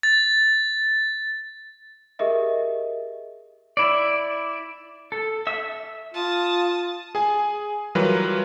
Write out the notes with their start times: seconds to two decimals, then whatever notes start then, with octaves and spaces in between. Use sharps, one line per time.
0.03 A6
2.19 G4 G#4 A#4 D#5 E5
3.77 E4 D5
5.12 A4
5.47 E5 E6
6.14 F4 A5 D#6
7.15 G#4 G#5
7.95 E3 F#3 G3 F4 A#4 B4